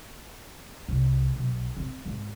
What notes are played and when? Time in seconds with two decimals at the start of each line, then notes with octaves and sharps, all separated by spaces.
0.88 C2
1.36 B1
1.77 C4
2.06 G#1